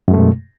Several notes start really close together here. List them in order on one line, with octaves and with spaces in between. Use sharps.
F#2 G#3 A3 B2